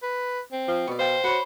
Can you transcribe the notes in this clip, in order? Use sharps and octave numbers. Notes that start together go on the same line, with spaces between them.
B4
C4
F3
B2 D5 C#6
C5 F5 G5 A5
F#4 B4 C#5